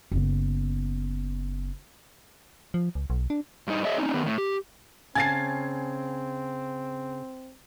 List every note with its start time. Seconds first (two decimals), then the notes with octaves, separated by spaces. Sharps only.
0.12 F#1 B3
2.74 F3
2.95 C#2
3.10 B1
3.30 D4
3.67 G2 D#4
3.84 G#4 C#5 D#5 E5
3.98 C4 C#4 D#4
4.14 D#3 B3
4.26 A2
4.38 G4
5.15 C#3 C4 G#5 A5 G#6 A6 C7